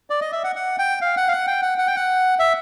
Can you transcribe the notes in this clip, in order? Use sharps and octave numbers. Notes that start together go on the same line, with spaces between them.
D5
D#5
E5
F#5
F#5
G5
F5
F#5
F5
F#5
G5
F#5
F#5
G5
F#5
E5